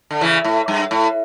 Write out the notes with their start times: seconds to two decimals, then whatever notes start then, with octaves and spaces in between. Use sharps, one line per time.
0.11 D3
0.21 C#3 E3
0.44 A2
0.68 G2
0.91 A2